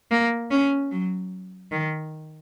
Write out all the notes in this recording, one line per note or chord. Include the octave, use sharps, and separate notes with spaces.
A#3
C#4
F#3
D#3